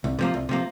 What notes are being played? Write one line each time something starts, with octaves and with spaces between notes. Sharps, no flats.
C2
C3 F3 A#3
C2
C3 F3 A#3